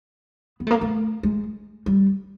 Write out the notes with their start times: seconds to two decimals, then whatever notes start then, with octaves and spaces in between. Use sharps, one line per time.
0.60 B3
0.67 A3
0.71 A#3
0.81 A3
1.23 G#3
1.86 G3